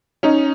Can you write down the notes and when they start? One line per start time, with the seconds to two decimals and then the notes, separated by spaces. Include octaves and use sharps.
0.23 C#4 D#4